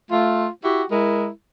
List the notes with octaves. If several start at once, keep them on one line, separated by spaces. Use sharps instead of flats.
A3 F4
E4 F#4 G4
G#3 E4 A#4